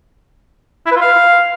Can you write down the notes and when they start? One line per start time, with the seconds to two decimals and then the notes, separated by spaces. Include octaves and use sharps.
0.86 E4
0.91 B4
0.96 F4
1.01 F5